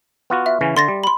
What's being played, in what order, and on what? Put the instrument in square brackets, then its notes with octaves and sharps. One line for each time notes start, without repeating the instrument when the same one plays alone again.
[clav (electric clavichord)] B3 F4 F#4
[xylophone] E5
[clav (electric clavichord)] C#3 E3 C#4
[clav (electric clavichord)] D3 [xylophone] C6 A6 A#6
[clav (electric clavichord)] G3
[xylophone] B5 C6